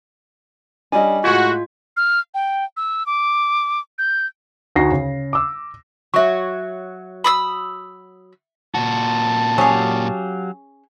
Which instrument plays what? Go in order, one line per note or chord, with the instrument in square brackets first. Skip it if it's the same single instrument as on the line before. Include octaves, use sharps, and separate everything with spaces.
[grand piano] G3 C#4 D4 [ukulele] D#5 G#5
[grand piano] A2 G#3 G#6 [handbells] F4 [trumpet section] F#4
[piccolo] F6
G5
E6
D6
G6
[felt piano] D2 D#4 F#4 A#6 C7
C#3
D6 E6
[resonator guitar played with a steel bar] F#3 F#4 C#5 [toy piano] E5 C#6
[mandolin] B5 D#6 E6
[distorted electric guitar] A#2 F#4 [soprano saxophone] A5
[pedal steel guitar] F#3 G4 F5 [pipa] C#4 G#4